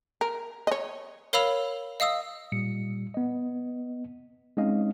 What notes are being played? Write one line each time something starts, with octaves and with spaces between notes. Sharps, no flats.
A#4
C#5 D#5
A#4 C#5 F5 B5 E6 F7
D#5 F5 D#6 E6
A#2 G3 C#7
B3 D#5
G#3 C4 C#4 D#4 D#5 F5